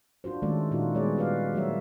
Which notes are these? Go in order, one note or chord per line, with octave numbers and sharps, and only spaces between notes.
D4 F4 F#4 C5
D#3 G#3 A3 C#4 A4 D5
A#2 C#4 D#4 F4 F#4
G3 G#3 B3 G#4 C#5 D5
B3 F4 F#4 B4 D5 F5
F#3 A3 F#4 A#4 C#5 E5